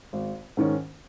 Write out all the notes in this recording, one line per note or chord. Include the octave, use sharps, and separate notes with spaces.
G#1
G#2 D#3 C#4